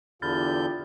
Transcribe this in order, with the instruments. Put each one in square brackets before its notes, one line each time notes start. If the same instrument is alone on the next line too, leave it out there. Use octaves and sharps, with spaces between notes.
[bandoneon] E2 D3 G6 [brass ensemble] F4 G4 [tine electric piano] B5 F6 A6